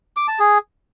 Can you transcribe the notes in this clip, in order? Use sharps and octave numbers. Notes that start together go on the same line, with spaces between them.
D6
A5
G#4